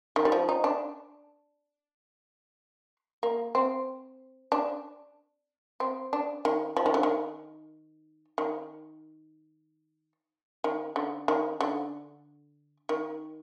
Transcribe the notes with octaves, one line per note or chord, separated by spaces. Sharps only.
D#3
G3
F3
D#4
D4
A#3
C4
D4
C4
D4
D#3
F3
D#3
D3
D#3
D#3
D#3
D3
D#3
D3
D#3